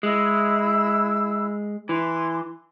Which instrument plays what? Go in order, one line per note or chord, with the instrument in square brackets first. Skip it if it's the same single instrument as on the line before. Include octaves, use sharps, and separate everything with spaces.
[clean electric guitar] G#3 [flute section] E4 E6
[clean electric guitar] E3 [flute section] C6 D6